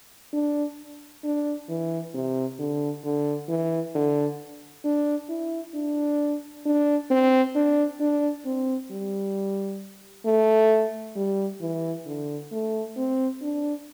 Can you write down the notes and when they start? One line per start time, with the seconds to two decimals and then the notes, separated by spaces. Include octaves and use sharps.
0.33 D4
1.24 D4
1.69 E3
2.14 C3
2.59 D3
3.04 D3
3.49 E3
3.95 D3
4.84 D4
5.29 E4
5.74 D4
6.65 D4
7.11 C4
7.55 D4
8.00 D4
8.45 C4
8.91 G3
10.25 A3
11.16 G3
11.61 E3
12.06 D3
12.52 A3
12.97 C4
13.42 D4